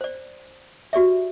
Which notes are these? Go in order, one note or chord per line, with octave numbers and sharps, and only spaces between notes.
C5 D5
F#4 G4 D5 E5